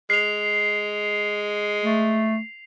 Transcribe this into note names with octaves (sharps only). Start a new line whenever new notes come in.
G#3 C7 F7
A3